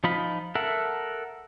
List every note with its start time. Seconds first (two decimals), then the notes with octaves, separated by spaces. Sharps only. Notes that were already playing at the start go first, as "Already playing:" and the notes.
0.04 F3 D#4 F4 B5
0.55 A4 A#4 E5 F#5